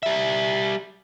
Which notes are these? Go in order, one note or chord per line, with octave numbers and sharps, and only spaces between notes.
G3 E5